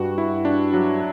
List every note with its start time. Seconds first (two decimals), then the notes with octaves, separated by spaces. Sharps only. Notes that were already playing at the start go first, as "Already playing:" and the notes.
Already playing: G2 F#4
0.18 E4
0.45 D4
0.74 F#3